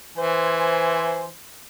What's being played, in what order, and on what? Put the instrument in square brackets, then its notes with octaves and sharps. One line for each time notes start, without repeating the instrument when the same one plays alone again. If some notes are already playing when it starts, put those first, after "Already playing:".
[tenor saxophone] E3 [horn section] C5 G#5